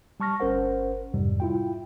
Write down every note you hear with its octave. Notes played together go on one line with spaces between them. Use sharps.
G3 A5 C#6 F6 A#6
G1 C#4 A#4 C5 F#5
F2 G#2 C3 G3
E4 F4 G5